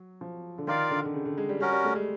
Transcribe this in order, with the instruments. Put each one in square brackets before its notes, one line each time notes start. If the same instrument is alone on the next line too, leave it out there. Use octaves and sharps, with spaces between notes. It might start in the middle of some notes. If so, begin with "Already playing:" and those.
Already playing: [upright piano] F#3
F3
D3
[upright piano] D#3 [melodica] F4 A#4 D5 F5
[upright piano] D3
D3
C#3
D3
G#3
G3
[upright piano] G3 [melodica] C#4 F#4 A#4
[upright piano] G3
A3
G#3